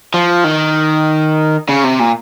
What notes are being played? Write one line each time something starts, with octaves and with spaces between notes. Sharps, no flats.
F3
D#3
C#3
C3
A#2